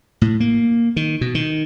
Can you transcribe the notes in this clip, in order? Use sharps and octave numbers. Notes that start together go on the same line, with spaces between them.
A2
A#3
D#3
B2
D#3